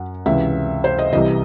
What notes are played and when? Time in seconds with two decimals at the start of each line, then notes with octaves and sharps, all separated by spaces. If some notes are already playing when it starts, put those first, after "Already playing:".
Already playing: F#2 F#5
0.26 C#2 C3 E3 E5
0.84 C5
0.99 D#5
1.13 C2 C3 E3 D#5